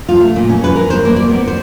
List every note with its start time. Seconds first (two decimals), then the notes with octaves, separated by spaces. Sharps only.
0.09 F4
0.20 A3
0.36 A#2
0.49 C#4
0.64 B4
0.76 A#4
0.90 C5
1.05 A#3
1.16 D5
1.30 B3
1.48 C5